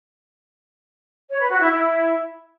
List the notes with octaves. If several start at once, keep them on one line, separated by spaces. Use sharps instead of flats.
C#5
B4
F#4
E4
E4